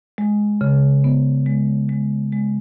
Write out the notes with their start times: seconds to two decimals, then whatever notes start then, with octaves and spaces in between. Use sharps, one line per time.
0.18 G#3
0.61 C#3
1.04 B3
1.46 G#3
1.89 G#3
2.32 G#3